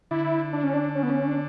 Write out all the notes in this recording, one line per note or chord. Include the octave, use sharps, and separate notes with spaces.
D3 E4
D4
C#4
D4
C#4
B3
C#4
D4